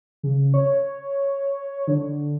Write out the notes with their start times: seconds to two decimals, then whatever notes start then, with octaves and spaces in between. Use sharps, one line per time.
0.23 C#3
0.54 C#5
1.88 D3